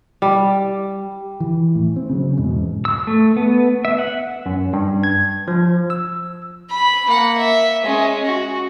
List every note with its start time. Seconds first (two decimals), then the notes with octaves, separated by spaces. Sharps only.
0.22 G3
1.40 E3
1.75 A2
1.96 C4
2.10 C#3 F#3
2.37 E2 G#2 B2
2.85 E6
3.07 A3
3.37 B3
3.85 E5
3.99 F#5
4.46 F#2
4.73 G2
5.04 G#6
5.48 F3
5.90 E6
6.70 B5
7.07 A#3 F#5
7.38 E5
7.84 G#3 C#4
8.25 F#4